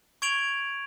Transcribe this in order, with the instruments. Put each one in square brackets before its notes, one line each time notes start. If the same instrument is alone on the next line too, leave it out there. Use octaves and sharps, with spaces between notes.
[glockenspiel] C#6 G#6 D7 F7 F#7